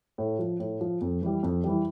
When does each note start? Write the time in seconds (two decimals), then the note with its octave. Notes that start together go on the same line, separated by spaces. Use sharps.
0.18 A2
0.39 F3
0.60 A2
0.81 F3
1.01 F2
1.22 E3 G3
1.43 F2
1.64 E3 G3